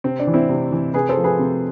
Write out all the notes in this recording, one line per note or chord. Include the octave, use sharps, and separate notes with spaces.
C3 C4
D4
E3
C4 E4
C3
E3
C3 G#4 B4
A4 C5
F3
G#4 B4
C3